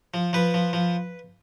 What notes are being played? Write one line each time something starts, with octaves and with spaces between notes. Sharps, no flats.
F3
F3 B4
F3
F3